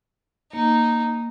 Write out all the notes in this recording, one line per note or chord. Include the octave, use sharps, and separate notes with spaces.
A#3 D#4